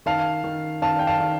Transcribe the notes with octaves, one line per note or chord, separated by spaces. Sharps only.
D#3 F5 A5
D#3
D#3 F5 A5
G5
F5 A5
D#3